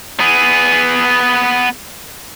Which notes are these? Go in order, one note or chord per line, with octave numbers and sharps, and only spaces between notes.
B3 G#4